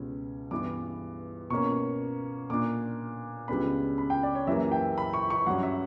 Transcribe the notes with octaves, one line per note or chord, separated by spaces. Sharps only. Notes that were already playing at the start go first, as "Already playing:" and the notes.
Already playing: C#2 B2 G3 C#4
G2 E3 B3 D6
B2 A#3 C#4 C#6
A#2 A#3 D4 D6
C#2 C#3 G3 B3 D4 B5
B5
G5
D5
C#5
F#2 E3 G3 A#3 E5
G5
B5
C#6
C#6
G2 F#3 C#4 F#5
E5